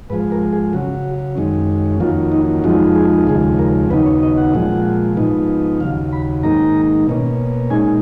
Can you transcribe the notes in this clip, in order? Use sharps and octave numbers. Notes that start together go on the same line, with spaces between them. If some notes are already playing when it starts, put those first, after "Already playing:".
G#2 F3 G#3 B4
A#4
G#4
C#3 F#3 C#4 F#4
F#2 D#3 G#3 C#4
F2 D#3 F#3 A#3 C#4 F4
D#4
F2 F3 G#3 D#4 F#4
G#4
D#2 C#3 F3 G#3 G#4
A#4
D#2 C#3 F#3 B3 D#4 B4
C#5
D#5
F#5
A#2 F3 G#3
G#2 F3 B3 D#4
D#2 C#3 F#3 F5
B5
G#2 D#3 A#3 D#4 A#5
B2 A#3 C#4
A#2 G#3 D#4 G#5